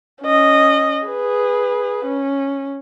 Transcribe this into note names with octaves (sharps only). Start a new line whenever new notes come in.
C#4 D#5
G#4 B4
C#4